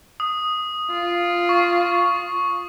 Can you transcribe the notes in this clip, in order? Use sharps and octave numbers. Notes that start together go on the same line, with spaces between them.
D#6
F4
C#6